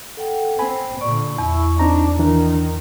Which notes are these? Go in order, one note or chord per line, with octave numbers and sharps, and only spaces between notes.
A4 F#5 G5
C4 G#5 B5
A#2 D3 D5 C#6
E2 E4
C4 D4 D#4 A#5
D#3 E3 D4 A#4 A#5